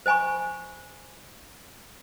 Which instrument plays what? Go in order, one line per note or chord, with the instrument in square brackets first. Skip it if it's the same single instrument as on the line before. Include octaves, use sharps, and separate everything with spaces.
[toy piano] C5 D#5 G#5 B5 C#6